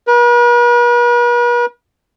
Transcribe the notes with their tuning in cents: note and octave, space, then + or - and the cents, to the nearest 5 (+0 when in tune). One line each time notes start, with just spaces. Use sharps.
B4 -45